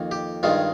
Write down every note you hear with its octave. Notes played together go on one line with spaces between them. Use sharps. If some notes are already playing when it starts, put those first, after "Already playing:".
Already playing: F2 D#3 A#3
G4
G2 D#3 G#3 F4